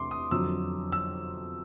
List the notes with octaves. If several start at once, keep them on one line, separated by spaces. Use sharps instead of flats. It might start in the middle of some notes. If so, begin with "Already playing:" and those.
Already playing: E2 C3 A3 D4 C6 D6
D#6
F2 D3 F#3 E6
E6